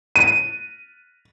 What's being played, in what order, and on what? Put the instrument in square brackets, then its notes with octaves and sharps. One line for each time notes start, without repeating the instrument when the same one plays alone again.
[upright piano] D#7